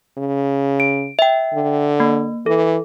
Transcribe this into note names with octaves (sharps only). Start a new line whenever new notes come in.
C#3
D7
E5 G5
D3
A#3
E3 A4